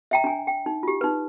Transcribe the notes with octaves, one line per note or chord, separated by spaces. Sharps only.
E5 G5 A#5
D4 G#5
G5
D#4
F4 G4
D#4 B4